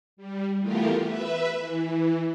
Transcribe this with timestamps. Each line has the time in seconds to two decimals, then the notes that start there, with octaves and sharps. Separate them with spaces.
0.17 G3
0.59 E3 A3 B3 F4 G4 A#4
1.03 B4 E5
1.58 E3